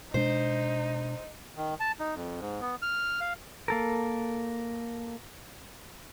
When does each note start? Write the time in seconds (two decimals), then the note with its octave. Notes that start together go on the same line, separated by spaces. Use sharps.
0.14 B2 G#3 D4 D#4 C5
1.56 D#3
1.80 A5
1.99 D#4
2.15 F2
2.41 G#2
2.61 B3
2.82 F6
3.21 F5
3.68 A#3 A4 A#4